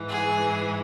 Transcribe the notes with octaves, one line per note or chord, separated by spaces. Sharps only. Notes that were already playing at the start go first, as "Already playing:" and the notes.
Already playing: G#2 E3
G#4